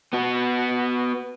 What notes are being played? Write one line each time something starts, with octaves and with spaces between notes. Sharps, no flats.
B3 F#4